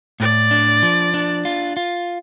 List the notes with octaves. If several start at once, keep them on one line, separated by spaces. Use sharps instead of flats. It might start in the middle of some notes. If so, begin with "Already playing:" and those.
A2 D5
D4
F3
D4
F4
F4